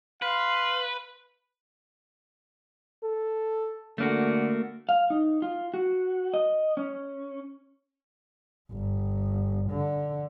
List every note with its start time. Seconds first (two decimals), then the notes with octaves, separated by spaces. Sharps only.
0.22 B4 F5 C6
3.03 A4
3.98 D3 A3 A#3 F#4
4.89 F5
5.10 D#4
5.42 F4
5.74 F#4
6.34 D#5
6.77 C#4
8.71 G1
9.71 D3